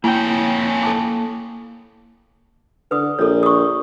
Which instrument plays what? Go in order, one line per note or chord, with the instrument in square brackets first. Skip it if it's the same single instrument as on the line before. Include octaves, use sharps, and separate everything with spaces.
[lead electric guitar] F2 C#4 [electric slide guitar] A#3 G5 [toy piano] E4 G#5
[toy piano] A4 A5 D6
[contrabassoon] D3 [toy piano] B4 D#6
[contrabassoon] A#1 [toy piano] A4 C#5
[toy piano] C#6 D#6